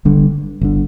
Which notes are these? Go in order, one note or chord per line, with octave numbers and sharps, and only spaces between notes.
G1 G2 D3
G1 D3